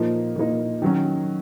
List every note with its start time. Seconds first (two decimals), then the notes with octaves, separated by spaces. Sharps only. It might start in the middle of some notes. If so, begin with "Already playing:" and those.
Already playing: A#2 F3 A#3 D#4
0.36 A#2 F3 A#3 D#4
0.82 D#3 F#3 C#4